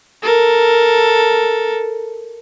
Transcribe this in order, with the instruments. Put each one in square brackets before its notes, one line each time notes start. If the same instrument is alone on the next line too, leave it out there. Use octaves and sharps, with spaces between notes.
[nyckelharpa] A4 A#4